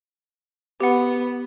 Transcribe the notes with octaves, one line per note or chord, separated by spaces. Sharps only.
B3 G4 F#5